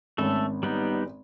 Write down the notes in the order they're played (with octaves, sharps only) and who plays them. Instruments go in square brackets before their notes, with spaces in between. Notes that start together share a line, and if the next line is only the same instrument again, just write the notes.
[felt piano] G#1 C#4 [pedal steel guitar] A3 A4
[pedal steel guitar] G3 B3 D#4